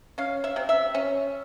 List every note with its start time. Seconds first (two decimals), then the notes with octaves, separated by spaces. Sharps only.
0.18 C#4 F5
0.44 E5
0.56 C3
0.69 E5
0.95 C#4